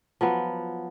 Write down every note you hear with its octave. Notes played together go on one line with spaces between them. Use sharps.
F3 F#3 B3